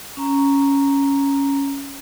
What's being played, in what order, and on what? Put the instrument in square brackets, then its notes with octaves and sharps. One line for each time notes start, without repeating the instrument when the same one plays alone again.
[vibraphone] C#4 A#5